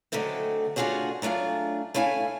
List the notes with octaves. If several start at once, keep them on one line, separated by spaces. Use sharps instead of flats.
D3 F#3 G#3 A3 C4
A3 D4 F4 F#4 G#4 C#5
F#3 A3 D4 F4 G#4
A3 E4 C#5 F5 G5 G#5